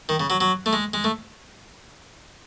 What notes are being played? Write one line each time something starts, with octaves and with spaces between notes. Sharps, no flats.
D#3
C#3
F#3
F#3
A3
G#3
G#3
A3